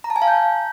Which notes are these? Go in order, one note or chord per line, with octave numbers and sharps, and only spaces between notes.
A#5
A5
G#5
F5
G6